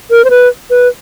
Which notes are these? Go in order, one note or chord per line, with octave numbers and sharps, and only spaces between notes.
A#4
C5
B4
B4